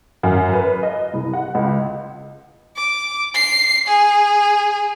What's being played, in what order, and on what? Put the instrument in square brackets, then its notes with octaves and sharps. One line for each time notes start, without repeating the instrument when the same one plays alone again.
[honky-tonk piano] F#2
B4
D#5
C2
F#5
C#2
[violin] D6
C7
G#4